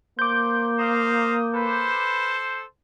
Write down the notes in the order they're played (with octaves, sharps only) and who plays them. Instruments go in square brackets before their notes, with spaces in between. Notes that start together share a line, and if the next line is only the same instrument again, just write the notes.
[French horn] A#3 [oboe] C5 [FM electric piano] D6 G6
[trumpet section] C5 F5 A#5 [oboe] D#6
[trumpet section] A4 C5 [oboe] B4